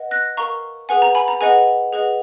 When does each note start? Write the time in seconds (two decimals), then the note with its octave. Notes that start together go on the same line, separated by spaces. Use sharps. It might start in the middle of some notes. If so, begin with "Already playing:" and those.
Already playing: B4 D#5 F#5
0.11 F#6 A#6
0.37 A#4 F5 A#5 C#6
0.89 G#4 B4 F#5 G#5
1.02 A#5
1.15 G#5 B5
1.28 A#5
1.41 G#4 B4 D#5 F#5 G#5
1.93 G#4 B4 D#5 F#5